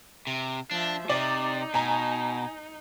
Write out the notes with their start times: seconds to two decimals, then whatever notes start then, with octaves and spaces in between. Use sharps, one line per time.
0.27 C3
0.71 F3 D4 E5
1.10 C3 D#4 D5
1.74 B2 G#5 A#5